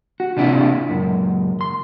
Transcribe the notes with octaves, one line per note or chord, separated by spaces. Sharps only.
F#4
C3 D4 E4 F4
C#2 F#2
C6